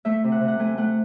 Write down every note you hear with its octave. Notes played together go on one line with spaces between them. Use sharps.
A3 E5
C3
F#5
C3
F#5
A3 G#5
A3 F#5